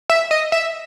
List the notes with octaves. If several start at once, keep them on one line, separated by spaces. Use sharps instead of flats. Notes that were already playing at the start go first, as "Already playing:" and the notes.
E5
D#5
E5